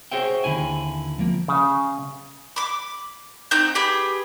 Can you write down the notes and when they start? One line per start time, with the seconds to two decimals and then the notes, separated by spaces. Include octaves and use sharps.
0.11 F#4 G#4 C5 C#5 E5 G5
0.44 D#2 D3 E4 G#5
1.19 F3 A#3
1.48 C#3
2.56 B5 D6
3.51 C4 D#4 F#5 G6
3.75 G4 G#4 B4 B5